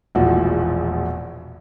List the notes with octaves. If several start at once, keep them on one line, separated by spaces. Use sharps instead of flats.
E1 A#1 A2 F4 F#4